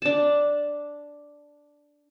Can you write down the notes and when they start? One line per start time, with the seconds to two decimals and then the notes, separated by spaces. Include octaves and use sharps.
0.02 D4 A5